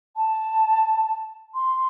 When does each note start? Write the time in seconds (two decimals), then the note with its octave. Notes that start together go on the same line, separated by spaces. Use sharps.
0.16 A5
1.54 C6